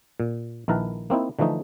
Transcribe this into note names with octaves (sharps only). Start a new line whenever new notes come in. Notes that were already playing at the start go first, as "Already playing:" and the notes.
A#2
A#1 D#3 E4 A#4 B4 A5
A#3 C4 D#4 E4
D3 E3 F3 A3 D#4